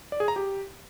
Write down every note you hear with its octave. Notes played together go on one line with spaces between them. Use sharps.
D5
G#4
A#5
G4